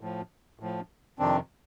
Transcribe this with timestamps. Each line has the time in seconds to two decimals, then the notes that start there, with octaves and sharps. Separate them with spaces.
0.01 A2 F3
0.60 A2 F3
1.19 F2 C3 D#3 C4 D4